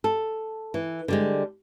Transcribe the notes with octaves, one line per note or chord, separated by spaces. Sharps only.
A4
E3
D3 G3 G#3